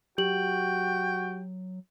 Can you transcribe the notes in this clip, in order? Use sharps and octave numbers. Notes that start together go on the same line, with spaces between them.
F#3 F#4 G4 G5 F#7